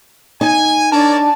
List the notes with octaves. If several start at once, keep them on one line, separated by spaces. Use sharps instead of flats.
D#4 G#5
D4 A#4 C#5 D5 A5